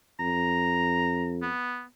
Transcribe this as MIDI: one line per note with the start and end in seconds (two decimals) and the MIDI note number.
0.20 1.49 41
0.20 1.34 82
1.42 1.84 59